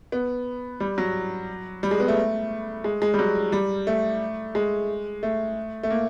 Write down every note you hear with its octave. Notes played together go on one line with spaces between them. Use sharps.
B3
G3
F#3
G3
G#3
B3
A3
G#3
G#3
G3
F#3
G3
A3
G#3
A3
A3
A#3